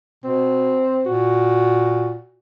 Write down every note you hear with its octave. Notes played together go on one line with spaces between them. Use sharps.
B2 C4
A#2 F#4